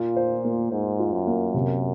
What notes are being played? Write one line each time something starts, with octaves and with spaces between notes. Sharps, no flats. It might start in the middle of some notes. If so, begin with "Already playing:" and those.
Already playing: A#2 F4
C5
A#3
G#2 C5
F4
F#2
A#3
C3